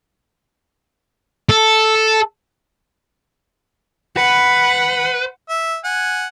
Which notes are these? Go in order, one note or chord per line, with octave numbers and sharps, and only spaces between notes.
A4
B4 F#5
E5
F#5 G#5